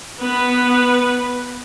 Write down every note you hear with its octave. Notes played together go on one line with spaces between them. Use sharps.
B3 B4